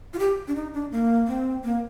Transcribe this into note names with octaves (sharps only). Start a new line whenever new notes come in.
F4
G4
D4
D#4
D4
A#3
C4
A#3